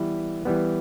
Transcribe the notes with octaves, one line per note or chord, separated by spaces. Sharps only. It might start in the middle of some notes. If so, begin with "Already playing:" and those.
Already playing: E3 G3 B3 E4
E3 G3 B3